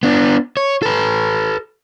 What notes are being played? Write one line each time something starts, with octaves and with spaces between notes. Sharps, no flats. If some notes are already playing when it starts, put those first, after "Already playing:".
B3 D4
C#5
A4 B4